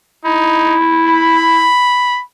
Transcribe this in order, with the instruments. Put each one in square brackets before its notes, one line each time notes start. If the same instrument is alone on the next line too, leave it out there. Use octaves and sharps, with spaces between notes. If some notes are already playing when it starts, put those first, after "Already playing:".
[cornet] D#4 [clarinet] E4
[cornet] B5